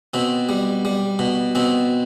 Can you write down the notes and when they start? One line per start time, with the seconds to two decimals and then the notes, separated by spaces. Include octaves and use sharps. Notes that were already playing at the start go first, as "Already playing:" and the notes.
0.14 B2 C4
0.49 G3
0.85 G3
1.19 B2
1.55 B2 C4